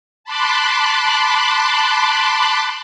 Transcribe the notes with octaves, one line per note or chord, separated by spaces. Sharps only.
A5 B5 C6 D6 F#6